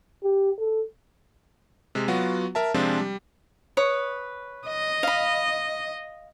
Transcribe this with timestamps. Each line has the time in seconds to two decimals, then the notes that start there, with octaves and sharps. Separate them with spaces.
0.23 G4
0.58 A4
1.95 C3 G#3
2.08 F#3 B3 F4 F#4
2.55 A#4 E5 A5
2.74 C3 F3 G#3 C4 D4 F4
2.99 G3
3.77 B4 C#5 D#6
4.67 D#5
5.03 F5 B5